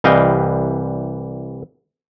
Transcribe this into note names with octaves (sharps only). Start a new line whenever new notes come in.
C2 E3 G3 D#5 F5 G5